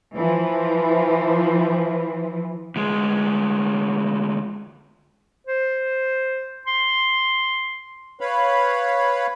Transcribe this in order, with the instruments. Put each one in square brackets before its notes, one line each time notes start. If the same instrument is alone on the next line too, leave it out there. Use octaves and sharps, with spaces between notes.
[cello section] E3 F3
[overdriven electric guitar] D2 G#3
[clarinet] C5
C6
[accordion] B4 C#5 F5 B5